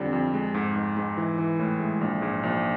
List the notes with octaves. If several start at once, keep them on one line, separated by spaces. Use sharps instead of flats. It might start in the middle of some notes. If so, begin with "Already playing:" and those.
Already playing: F2 D3 G3 C4
F2
G#3
G#2
G#2
G#2
E3
E3
A2
G#3
A#1
G#2
A#1